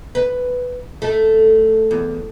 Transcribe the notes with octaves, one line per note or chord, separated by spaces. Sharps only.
B4
A3
E2